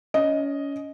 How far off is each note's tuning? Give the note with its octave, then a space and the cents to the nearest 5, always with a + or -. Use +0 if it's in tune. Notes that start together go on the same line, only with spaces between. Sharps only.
C#4 +25 D#5 +0